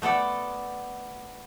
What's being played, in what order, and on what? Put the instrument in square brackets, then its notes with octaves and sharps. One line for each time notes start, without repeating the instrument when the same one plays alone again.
[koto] A3 B3 A4 D5